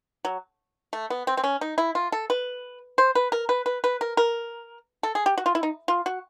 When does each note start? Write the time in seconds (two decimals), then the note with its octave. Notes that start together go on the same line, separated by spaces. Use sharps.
0.25 F#3
0.93 A3
1.10 B3
1.27 C4
1.37 C4
1.44 C#4
1.61 D#4
1.78 E4
1.95 F4
2.12 A4
2.30 B4
2.98 C5
3.15 B4
3.32 A#4
3.49 B4
3.66 B4
3.84 B4
4.01 A#4
4.17 A#4
5.03 A4
5.15 G#4
5.26 G4
5.38 F#4
5.46 F4
5.55 E4
5.63 D#4
5.88 F4
6.06 F#4